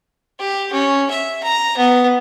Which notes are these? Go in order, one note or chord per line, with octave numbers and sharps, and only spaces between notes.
G4
C#4
E5
A#5
B3